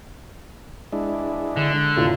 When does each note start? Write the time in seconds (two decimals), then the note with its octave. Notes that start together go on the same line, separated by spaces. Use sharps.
0.92 G#3 D4 E4
1.57 D3
1.96 F1 A2 F4